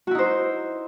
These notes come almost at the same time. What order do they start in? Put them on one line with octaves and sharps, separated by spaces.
F#4 E4 D#4 C5